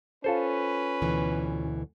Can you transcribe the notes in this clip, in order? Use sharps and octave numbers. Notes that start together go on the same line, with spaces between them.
C#4 F4 A4 B4 C5
D2 B2 E3